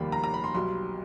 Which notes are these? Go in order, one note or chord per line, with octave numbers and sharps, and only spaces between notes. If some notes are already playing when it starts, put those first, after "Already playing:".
Already playing: F1 D#2 D#3 G3 A#3 B5
A#5
A#5
B5
C6
B1 B2 G3 C6